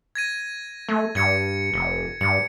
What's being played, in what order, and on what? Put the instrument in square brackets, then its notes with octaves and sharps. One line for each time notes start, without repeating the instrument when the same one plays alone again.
[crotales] G#6 A#6 D#7
[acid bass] A3
[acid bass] G2 [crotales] G#6 C#7
[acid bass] F1
[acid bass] G2 [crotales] C#7